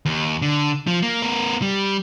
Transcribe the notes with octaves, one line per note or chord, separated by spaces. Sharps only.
D#2
D3
F3
A#3
B3 A#4
G3